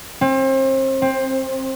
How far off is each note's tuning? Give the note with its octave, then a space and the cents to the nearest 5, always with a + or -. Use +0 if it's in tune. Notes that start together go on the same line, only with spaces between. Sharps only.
C4 +35
C4 +15